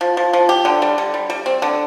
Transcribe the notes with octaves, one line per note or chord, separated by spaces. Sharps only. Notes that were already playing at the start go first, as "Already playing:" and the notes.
F3
F3
F3
G4
D3
G3
D3
G3
G3
C4
D3